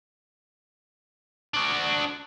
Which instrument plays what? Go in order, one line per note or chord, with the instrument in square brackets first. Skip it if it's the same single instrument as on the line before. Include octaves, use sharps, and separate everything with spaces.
[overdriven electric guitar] D4 F#4